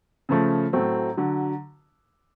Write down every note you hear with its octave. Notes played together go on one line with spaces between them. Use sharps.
C#3 F3 A3
A2 F#3 A3 C4
D3 F#3